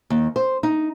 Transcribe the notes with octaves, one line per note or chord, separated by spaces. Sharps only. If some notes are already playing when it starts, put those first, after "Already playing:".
D#2
C5
D#4